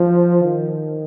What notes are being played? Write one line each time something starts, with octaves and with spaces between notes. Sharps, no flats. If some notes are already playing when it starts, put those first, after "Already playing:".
Already playing: F3
D#3